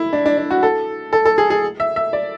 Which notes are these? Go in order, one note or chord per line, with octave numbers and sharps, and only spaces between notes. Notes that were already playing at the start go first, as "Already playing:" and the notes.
Already playing: E4
D4
D4
D4
F#4
A4
A4
A4
G#4
G#4
E5
E5
D5